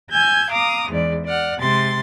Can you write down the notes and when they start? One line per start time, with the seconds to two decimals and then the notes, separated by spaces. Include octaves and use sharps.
0.11 G#5 E6 G6 G#6
0.49 F5 A#5 D6 D#6
0.90 E2 G#2 E3 D5
1.24 D5 F#5 F6
1.59 C3 G#3 C6 A6